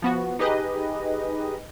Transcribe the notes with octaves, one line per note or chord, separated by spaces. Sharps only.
F3 B3 F#4
D#4 G4 G#4 B4 D#5